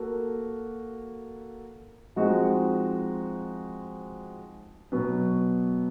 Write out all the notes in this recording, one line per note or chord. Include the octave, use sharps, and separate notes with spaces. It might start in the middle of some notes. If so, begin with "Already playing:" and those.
Already playing: A#3 F#4 A4
F3 G#3 C4 D#4 F#4
B2 F#3 B3